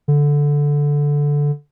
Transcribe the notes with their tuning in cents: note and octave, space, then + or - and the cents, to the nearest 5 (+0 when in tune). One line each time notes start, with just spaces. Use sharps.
D3 -10